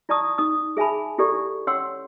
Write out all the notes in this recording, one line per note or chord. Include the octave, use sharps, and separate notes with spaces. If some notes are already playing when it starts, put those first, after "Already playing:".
E4 D5 A5 C#6 D#6
D#4 D#6
G#4 E5 G#5 A5 B5
E4 G4 A4 D5 C#6
C#4 C#5 F#5 G5 C6 E6